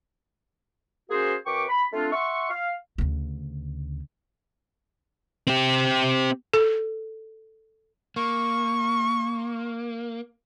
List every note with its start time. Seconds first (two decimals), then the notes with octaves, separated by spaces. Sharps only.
1.10 A#3 C#4 F#4 G#4 C5
1.46 F#2 B4 G5 C#6 D6
1.69 B5
1.93 A3 C4 D4 F4
2.12 E5 F#5 C6 C#6
2.49 F5
2.98 D2 C#3
5.47 C4 G4
6.54 A4
8.16 A#3 C#6